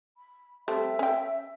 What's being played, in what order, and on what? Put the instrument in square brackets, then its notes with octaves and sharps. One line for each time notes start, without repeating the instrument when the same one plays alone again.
[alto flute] B5
[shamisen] G3 A3 C4 [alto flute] E5
[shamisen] C#4 G5